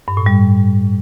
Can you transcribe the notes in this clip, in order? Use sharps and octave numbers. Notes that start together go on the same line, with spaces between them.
G2
A2
G3